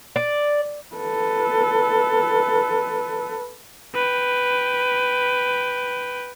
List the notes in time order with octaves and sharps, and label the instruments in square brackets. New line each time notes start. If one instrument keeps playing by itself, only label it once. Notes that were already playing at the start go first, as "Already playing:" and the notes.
[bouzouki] D5
[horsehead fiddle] A4 B4
[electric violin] B4 G5